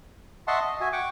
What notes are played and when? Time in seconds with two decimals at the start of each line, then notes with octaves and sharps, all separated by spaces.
0.47 D#5 E5 F#5 A5 C6 C#6
0.61 D#5
0.80 F#4 E5 G#5
0.93 F#5 G5 C#6 D6